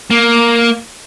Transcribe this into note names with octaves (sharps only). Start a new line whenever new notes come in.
A#3